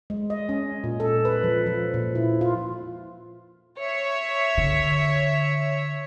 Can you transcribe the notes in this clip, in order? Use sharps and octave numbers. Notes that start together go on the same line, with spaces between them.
G#3
D#5
C#4
A#2
A4
B4
F3
F3
A#2
E4
F4
C#5 E5
D3